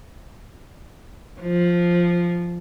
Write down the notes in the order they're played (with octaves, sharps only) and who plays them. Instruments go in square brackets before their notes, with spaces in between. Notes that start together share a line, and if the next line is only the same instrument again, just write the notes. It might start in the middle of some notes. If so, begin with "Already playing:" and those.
[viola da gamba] F3